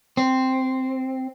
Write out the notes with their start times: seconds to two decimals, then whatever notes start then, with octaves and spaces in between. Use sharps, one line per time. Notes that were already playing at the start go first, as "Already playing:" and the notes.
0.17 C4